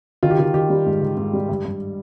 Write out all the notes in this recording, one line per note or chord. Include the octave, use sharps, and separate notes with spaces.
D#3 F4
G4
D#3 F4
D#3 G4
G3
G#2
D#3
G#2
G3
G2
G2